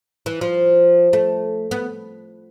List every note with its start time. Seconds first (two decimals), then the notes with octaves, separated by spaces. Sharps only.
0.26 E3
0.41 F3
1.13 A3
1.71 B3